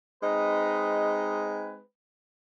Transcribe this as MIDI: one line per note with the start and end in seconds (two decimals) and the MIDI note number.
0.22 1.78 56
0.22 1.78 60
0.22 1.78 63
0.22 1.78 71